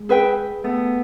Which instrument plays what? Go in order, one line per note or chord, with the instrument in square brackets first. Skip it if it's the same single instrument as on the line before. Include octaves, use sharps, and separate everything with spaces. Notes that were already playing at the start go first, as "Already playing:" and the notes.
Already playing: [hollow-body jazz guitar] G#3
[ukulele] G#4 B4 E5 G5
[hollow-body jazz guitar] A3 B3